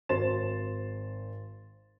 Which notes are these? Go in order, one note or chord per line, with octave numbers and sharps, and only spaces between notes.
G#1 C5 C6 A6 E7